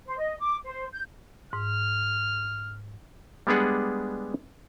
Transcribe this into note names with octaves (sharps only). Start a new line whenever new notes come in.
C5
D#5
D6
C5
G6
G#2 F6
G3 G#3 B3 D4 G#4 F#5